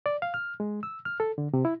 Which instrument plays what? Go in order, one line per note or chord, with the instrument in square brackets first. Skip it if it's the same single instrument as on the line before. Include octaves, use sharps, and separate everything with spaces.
[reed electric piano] D5
F5
F6
G#3
E6
F6
A4
D3
C3
E4